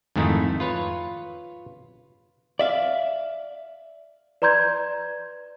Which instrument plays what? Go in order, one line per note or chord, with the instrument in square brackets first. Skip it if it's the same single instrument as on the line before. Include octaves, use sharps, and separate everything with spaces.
[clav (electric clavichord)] F2 G#2 D#3 A3 D#4 E4
F4 B4 C#5
[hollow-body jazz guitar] D5 E5 F5
[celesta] B4 D5 A#5 C6 G6 G#6